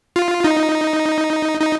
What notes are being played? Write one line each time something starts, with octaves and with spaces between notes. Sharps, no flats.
F4
D#4
D#4